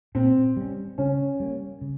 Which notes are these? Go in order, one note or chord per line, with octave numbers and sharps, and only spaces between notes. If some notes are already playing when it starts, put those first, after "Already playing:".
A#2 C4
G3 C#4
C#3 C#4
G3 A#3
C#3